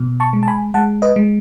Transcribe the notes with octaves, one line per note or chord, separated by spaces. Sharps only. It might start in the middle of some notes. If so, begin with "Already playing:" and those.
Already playing: B2
A5 C#6
G#3
A5
G#5 B5
G#3 F#5 A5
B4 D#5
G#3